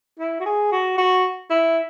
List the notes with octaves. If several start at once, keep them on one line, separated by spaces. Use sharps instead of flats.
E4
F#4
G#4
F#4
F#4
E4